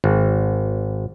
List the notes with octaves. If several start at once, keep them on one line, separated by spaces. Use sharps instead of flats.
G#1